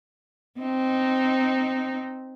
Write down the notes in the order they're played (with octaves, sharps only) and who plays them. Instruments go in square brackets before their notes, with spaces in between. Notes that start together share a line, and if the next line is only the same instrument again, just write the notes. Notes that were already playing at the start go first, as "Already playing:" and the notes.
[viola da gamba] C4 D#4